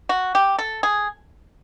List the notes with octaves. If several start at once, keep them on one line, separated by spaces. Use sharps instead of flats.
F#4
G4
A4
G#4